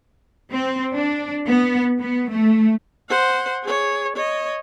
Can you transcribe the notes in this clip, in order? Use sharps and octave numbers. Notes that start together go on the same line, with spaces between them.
C4
D4
B3
B3
A3
C5 F#5
G#4 C#5
C#5 D#5